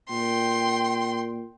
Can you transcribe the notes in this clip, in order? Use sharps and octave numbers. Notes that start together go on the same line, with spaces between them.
A#2 G5 C6